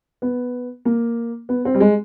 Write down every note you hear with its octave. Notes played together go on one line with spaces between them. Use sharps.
B3
A#3
B3
C4
G3
G#3